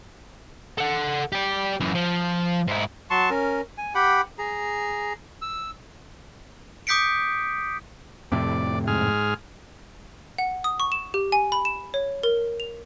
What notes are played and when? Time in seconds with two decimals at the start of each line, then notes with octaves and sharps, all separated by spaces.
0.78 A4 F#5
1.32 G4 D5
1.80 F#2 E3
1.95 F3
2.67 G#2 E4
3.10 F#3 A5 C6 C#6
3.30 C#4 A#4
3.78 G#5
3.95 G4 F#5 G5 B5
4.38 G#4 A#5
5.42 E6
6.87 D6 D#6 G6 B6 C#7 D7
8.32 F2 A2 C3 D5
8.87 G#2 G#4 F6
10.38 F#5
10.64 D#6
10.80 C#6
10.92 E7
11.14 G4
11.32 G#5
11.52 B5
11.65 E7
11.94 C#5
12.23 A#4
12.60 F7